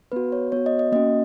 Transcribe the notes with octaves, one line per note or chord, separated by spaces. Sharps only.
B3 F#4 B4
C#5
B3 F#4 C#5
D#5
D#5
A#3 C#4 F#4 D#5